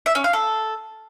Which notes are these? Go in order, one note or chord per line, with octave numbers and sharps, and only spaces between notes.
E5
C#4
F5
A4